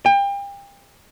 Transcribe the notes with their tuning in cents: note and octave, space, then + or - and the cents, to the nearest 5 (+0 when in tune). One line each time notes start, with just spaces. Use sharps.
G5 +35